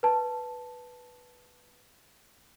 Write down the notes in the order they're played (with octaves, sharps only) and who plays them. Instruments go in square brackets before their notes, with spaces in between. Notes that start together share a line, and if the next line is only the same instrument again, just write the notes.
[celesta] B4 A5